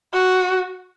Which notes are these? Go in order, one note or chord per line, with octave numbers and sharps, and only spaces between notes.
F#4